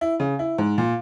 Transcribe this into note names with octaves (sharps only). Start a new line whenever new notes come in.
E4
C#3
E4
G#2
A#2